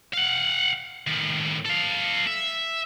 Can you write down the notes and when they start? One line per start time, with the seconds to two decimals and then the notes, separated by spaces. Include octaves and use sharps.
0.14 F5 F#5
1.07 A2 D#3
1.65 A4 F5
2.27 E5